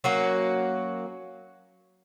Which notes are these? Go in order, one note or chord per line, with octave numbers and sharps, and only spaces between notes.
F#3 A#3 C#4 F#4